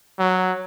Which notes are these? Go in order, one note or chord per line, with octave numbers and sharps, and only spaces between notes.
F#3